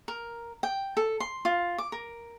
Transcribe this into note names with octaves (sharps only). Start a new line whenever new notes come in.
A#4
G5
A4
C6
F4
D6
A#4